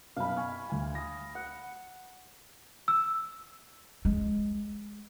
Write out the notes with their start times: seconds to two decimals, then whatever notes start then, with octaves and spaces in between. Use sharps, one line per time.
0.16 F#2 B2 F5 B5
0.36 G#5 C#6 F6
0.70 D2 G#5
0.95 D#6 A#6
1.35 F#5
2.88 E6
4.05 G#3